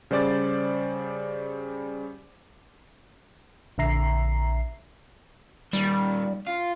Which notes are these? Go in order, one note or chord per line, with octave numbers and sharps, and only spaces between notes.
C#3 G3 C5 D5 D6 A6
A#1 D3 E5 A#5 C7
A#2 D#3 G3
F4